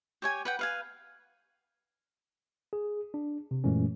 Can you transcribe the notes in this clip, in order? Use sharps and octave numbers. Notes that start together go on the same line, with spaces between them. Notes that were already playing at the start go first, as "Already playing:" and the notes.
G4 C#5 G#5
B4 F#5 G5
B4 F5 G#5
G#4
D4
C3
F#2 A#2 E3 G#3 A3 C#4